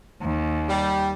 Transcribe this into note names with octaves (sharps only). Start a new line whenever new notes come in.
D#2
G3